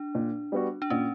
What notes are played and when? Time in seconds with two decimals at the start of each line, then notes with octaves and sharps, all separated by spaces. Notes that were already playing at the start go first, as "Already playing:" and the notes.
Already playing: D4
0.15 A#2
0.52 G3 B3 F#4
0.82 D4
0.90 A#2 C#4